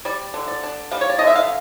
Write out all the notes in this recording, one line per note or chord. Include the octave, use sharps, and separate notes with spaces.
G3 D5
D3
D5
D4
G3 F5
C#5
D5
D3 D#5
E5
F5